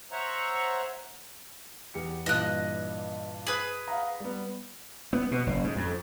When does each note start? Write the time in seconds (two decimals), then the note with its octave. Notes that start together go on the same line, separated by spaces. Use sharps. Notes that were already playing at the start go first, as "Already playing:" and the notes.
0.12 C5 C#5 E5 F#5 A#5 C#6
1.94 E2 G4 C#7
2.26 G2 A#2 E3 D#5 F#6
3.47 G#4 B4
3.88 F5 F#5 A#5
4.20 G3 B3
5.13 B3
5.31 B2
5.47 F#1
5.64 G#2
5.77 F2